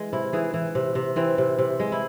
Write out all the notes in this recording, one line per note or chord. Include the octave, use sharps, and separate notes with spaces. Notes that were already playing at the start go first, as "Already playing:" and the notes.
Already playing: E3 G#3
C3 E4
E3 G#4
E3
C3
C3
E3 C4
C3
C3
G#3
E4